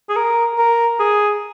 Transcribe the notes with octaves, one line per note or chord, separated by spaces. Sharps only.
G#4
A#4
A#4
G#4